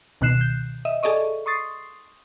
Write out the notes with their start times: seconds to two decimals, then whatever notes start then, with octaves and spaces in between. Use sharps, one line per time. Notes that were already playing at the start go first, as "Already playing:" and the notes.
0.21 C#2 B2 D#3 F#6 C7 E7
0.41 G6
0.85 D#5 E5
1.03 G#4 A4 D5 D#5 C#6
1.46 C6 C#6 D#6 A6 C7